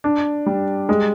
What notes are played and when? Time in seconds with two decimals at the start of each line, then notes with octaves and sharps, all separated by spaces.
0.04 D4
0.46 G3
0.89 G#3